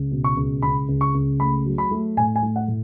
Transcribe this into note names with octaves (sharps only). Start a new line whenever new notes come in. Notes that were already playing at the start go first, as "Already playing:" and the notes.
Already playing: C#2
B2
C#6
C#2
C#2 B5
C#2
C#6
C#2
A3 B5
F#3
B5
A3
A2 G#5
G#5
A3
F#5
A2